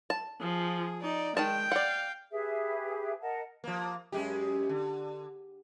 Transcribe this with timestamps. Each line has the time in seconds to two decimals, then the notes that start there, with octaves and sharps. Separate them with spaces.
0.10 A5
0.41 F3 G#4
1.02 D#4 D5
1.37 D#3 G#3 D#4 G5 A5
1.72 D5 F5 F#5
2.31 G4 G#4 B4 E5
3.20 A#4 D#5 F#5 A5
3.64 F3 A#3
4.12 F#2 G#3 G4
4.69 D3